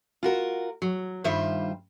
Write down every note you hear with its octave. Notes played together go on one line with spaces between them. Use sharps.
F4 F#4 A#4
F#3
G2 D#3 G3 F4 C5 E5